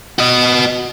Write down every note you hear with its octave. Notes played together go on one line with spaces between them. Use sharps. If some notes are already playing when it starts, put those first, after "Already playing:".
F#4 D#5